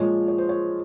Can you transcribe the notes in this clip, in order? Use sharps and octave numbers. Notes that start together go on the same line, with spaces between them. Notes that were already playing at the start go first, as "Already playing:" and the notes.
Already playing: A#2 F3 G#3 C#5
C#5
C5
C#5